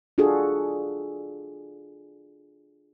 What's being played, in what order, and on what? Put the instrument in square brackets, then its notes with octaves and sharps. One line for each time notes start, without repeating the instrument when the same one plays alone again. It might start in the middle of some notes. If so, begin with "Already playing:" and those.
[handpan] D4 F4 F#4 G#4 A4